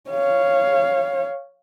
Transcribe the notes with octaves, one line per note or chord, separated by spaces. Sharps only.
C#5 F5